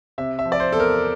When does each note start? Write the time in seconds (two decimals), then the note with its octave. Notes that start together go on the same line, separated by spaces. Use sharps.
0.18 C3 E5
0.39 E5
0.45 F3
0.52 D5
0.60 C5
0.72 E2 A4
0.80 A#4